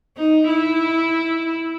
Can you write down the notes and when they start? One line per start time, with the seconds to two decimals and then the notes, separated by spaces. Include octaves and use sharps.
0.17 D#4
0.48 E4